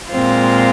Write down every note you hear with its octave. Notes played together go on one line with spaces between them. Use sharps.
A#2 G#3 C4 F4